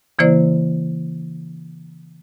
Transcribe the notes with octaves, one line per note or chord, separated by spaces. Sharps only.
C#3 E3 A#3 E4 C5 D5